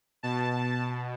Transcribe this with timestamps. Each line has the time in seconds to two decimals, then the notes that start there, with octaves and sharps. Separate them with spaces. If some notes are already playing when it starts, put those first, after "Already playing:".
0.23 B2 A5